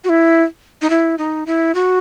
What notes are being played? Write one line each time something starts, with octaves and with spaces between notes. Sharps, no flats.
F#4
E4
D#4
E4
D#4
E4
F#4